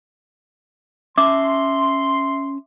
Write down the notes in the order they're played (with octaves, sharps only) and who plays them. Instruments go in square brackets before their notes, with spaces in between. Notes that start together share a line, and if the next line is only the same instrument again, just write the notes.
[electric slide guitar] C#4 A5 [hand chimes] E5 [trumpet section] C6 [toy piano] D6